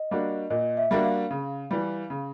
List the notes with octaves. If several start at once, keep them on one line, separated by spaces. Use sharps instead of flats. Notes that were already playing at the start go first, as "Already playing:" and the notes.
Already playing: D#5
G3 A#3 D4 F#4
A#2 D#5
E5
G3 A#3 D4 F#4
F5
C#3
E3 G3
C#3